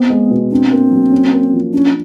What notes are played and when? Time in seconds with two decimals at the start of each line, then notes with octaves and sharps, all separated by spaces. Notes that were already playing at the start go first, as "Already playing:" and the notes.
Already playing: B3 C4
0.10 G#3
0.31 B2
0.51 C4 D4
0.72 A#3
0.91 F#3
1.12 C#4
1.33 A#3
1.53 F3
1.73 C#4 D4